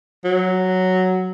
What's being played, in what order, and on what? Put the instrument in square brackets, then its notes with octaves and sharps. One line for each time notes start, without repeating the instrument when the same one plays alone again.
[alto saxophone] F#3